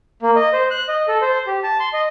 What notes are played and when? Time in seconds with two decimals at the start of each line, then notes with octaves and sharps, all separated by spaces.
0.22 A#3
0.36 D#5
0.53 C5
0.71 F#6
0.88 D#5
1.08 A4
1.22 C5
1.47 G4
1.63 A5
1.80 C6
1.93 D#5